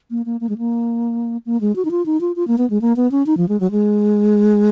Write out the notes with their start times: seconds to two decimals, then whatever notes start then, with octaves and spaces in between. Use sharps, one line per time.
0.11 A#3
0.26 A#3
0.41 A#3
0.49 G#3
0.58 A#3
1.46 A#3
1.61 G#3
1.76 F#4
1.85 D#4
1.91 F4
2.06 D#4
2.21 F4
2.36 F4
2.48 A#3
2.58 B3
2.70 G#3
2.81 A#3
2.96 B3
3.11 C#4
3.26 D#4
3.37 F3
3.49 G#3
3.60 F#3
3.72 G#3